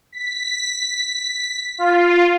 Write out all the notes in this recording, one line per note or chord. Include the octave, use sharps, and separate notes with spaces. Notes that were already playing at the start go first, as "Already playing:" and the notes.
B6
F4